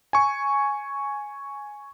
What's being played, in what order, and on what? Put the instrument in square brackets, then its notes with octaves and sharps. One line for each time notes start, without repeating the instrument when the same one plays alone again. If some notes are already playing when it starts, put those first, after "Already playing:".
[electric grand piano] G#5 C#6